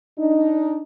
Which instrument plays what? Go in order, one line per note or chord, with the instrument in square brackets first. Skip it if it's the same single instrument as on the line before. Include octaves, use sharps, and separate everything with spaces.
[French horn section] D4 D#4